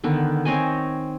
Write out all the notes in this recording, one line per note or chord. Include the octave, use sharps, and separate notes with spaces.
D3 D#3 B3
C4 C#5 D#5 G#5